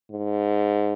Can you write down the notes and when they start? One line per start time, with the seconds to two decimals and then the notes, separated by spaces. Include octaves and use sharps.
0.11 G#2